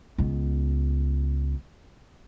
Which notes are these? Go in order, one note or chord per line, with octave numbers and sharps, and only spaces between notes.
C#2 B3